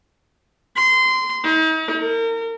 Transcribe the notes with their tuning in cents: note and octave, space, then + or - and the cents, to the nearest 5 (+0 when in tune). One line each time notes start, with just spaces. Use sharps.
C6 -20
D#4 +40
A#4 -35